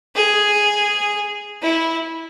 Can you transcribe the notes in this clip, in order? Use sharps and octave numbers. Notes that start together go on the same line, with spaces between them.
G#4
E4